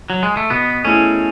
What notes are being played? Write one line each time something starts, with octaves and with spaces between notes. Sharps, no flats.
F#3
G#3
A3
B2 B3
A3 C#4 E4 G#4